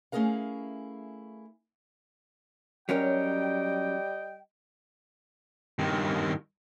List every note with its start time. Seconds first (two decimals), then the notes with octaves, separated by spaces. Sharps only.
0.12 A3 C#4 E4 G#4 A#4 F5
2.89 F#3 G3 C#4 A#4 D#5 G5
5.79 G2 D#3